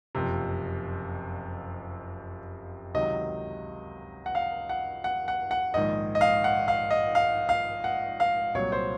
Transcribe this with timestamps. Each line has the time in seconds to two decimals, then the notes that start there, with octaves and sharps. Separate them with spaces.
0.15 F#1 F2 C3
2.94 C#2 C3 D#3 F#3 D#5
4.26 F#5
4.35 F5
4.69 F#5
5.04 F#5
5.28 F#5
5.51 F#5
5.74 A#1 G#2 D#3 D#5
6.15 D#5
6.21 F5
6.44 F#5
6.68 F5
6.91 D#5
7.15 F5
7.49 F5
7.84 F#5
8.20 F5
8.54 C2 A#2 F#3 C#5
8.72 C5